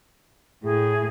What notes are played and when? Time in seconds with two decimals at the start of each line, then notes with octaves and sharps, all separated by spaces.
0.64 A2 G#4